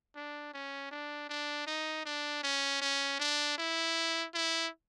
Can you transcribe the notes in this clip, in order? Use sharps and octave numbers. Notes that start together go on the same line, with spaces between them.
D4
C#4
D4
D4
D#4
D4
C#4
C#4
D4
E4
E4